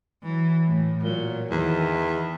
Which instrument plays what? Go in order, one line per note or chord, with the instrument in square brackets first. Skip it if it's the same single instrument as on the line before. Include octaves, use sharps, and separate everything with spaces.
[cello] E3 F#3
A2
[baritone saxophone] A#2 [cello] F#3
[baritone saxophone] E2 [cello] D#3 E3